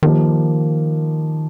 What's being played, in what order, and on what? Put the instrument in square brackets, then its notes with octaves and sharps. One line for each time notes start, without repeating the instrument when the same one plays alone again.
[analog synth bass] D#3 [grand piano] F3 A#3 D#4 G4